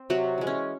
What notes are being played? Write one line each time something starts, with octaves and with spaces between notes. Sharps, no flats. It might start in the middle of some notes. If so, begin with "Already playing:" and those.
Already playing: C4 C5
C3 F#3 F#4
E3 G#3
C#4